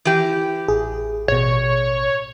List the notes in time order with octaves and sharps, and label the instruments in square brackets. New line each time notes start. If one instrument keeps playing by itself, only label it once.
[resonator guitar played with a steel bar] E3 G4
[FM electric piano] A1 G#4
[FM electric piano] A1 B2 [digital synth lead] C#5